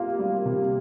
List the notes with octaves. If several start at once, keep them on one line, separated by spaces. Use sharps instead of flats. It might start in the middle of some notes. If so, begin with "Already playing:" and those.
Already playing: C3 A#3 F4
G3
C3